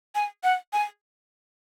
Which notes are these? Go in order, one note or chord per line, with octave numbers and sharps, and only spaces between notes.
G#5
F#5
G#5